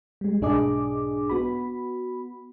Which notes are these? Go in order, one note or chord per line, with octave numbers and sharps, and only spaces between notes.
G3 G#3
B1 G#2 D4 G#4 D#5 D6
B3 F#4 B5